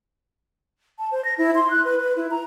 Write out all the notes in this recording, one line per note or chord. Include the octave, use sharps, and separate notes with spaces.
A5
C5
A#6
E4
C6
F#6
B4
B4
E4
A#5